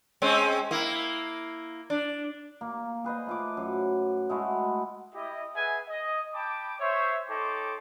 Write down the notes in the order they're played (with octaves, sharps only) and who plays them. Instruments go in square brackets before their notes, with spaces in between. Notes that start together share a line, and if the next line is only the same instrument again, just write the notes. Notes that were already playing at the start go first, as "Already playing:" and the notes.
[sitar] G#3 C4 C#4
A#3 E4
D4
[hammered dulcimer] A#3
G#4 B4 C5 D#5
A3 F4 D6
F#2
G#3 A3 E4 F#4
[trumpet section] E4 G4 D#5
G#4 B4 E5 F#5 G#5
D#5
G5 A5 B5 D6
C5 C#5 E5
D#4 A4 C#5 G5 C6 D6